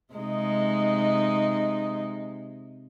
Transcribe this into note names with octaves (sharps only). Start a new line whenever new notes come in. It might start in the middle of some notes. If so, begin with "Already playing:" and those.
C3 G#3 D#4